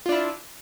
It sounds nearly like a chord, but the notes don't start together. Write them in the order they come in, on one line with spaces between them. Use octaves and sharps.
F4 D4 E4